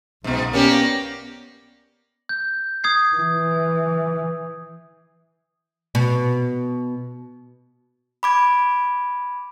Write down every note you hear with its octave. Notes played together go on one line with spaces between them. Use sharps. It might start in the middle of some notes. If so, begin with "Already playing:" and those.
B1 G#2 B2
A#3 B3 C#4 G4 C#5 D5
G6
D#6 G#6 C7
E3
B2
B5 D6 G#6